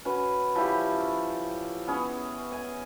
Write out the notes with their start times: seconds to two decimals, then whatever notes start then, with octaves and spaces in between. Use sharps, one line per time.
0.05 C#4 F#4 B4
0.55 F3 C#4 E4 G4
1.87 B3 C#4 G#4
2.52 G#5